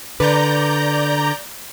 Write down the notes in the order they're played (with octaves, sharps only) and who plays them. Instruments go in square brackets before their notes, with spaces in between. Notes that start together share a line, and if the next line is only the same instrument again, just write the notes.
[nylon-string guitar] D3 B4 [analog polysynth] D5 A#5 G6